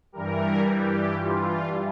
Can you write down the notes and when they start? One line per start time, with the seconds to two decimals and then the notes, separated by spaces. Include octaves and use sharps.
0.12 G2 E3 G3 A#4
0.66 G4
1.19 F4